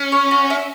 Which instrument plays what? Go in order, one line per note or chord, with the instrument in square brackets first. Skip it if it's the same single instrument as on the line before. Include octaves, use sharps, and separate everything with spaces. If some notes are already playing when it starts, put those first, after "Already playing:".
Already playing: [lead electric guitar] C#4
[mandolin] C#5
F#4
E5